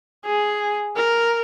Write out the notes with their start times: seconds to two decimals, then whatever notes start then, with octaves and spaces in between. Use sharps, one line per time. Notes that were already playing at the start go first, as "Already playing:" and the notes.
0.25 G#4
0.97 A#4